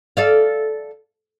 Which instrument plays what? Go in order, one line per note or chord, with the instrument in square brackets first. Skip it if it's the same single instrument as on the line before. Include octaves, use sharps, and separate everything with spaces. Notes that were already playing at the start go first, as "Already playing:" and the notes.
[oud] A4 D5 F5